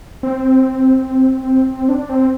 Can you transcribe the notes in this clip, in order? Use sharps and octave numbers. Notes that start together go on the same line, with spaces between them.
C4
D4
C4